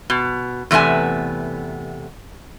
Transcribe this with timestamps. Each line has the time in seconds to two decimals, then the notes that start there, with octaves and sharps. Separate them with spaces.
0.10 B2
0.71 E2 C3 A3 B3 G#5